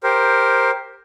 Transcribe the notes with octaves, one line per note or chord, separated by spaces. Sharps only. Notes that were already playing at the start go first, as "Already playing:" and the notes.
G4 A#4 C5